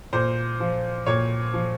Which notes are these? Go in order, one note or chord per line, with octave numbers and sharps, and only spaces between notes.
A#2 C5
F3
A#2 C#5
F3